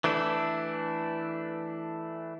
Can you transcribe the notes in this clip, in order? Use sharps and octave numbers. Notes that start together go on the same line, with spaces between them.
E3 A3 D4 E4